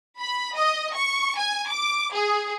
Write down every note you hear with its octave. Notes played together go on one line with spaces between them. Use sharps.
B5
D#5
C#6
G#5
D6
G#4